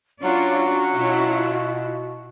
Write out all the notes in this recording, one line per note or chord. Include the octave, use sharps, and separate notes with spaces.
F#3 C#4 D4 F4 F#4 D5
B2 E4 F4